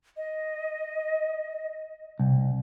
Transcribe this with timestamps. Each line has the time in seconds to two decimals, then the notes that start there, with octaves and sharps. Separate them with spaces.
0.17 D#5
2.19 C2